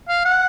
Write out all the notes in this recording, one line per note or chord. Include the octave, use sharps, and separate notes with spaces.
F5
F#5